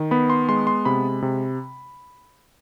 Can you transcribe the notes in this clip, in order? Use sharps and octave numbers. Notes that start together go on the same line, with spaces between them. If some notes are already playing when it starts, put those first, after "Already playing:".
Already playing: D#3
B3 B5
C6
G#3 C6
C6
C3 B5
C3